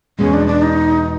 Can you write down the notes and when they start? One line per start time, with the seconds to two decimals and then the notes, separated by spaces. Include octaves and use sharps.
0.19 E2 B2 G#3 C#4
0.33 D4
0.47 D4
0.62 D#4